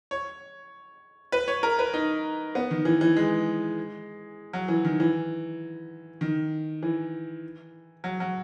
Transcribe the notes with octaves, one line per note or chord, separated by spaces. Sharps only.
C#5
B4
C#5
A#4
B4
D#4
B3
D#3
E3
E3
G#3
F#3
E3
D#3
E3
D#3
E3
F#3
F#3